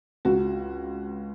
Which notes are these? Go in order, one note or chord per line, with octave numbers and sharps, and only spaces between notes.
C#2 F#4